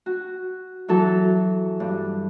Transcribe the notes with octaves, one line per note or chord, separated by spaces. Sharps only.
F#4
E3 F#3 F#4 A4
G2